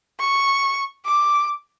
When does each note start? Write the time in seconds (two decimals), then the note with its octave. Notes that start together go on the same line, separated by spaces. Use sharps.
0.19 C#6
1.05 D6